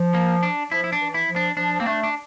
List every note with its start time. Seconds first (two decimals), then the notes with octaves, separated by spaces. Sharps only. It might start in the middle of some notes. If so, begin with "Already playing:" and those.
Already playing: F3
0.14 A#3
0.43 D4
0.72 F3 E4
0.84 E4
0.92 D4
1.00 E3
1.14 E4
1.29 F3
1.36 D4
1.57 F3 D4
1.80 A#3 C4
1.86 A3 D4
2.03 D4